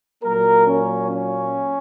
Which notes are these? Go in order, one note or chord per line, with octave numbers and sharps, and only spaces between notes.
A#2 F#3 A#3 A#4
C#4
C#4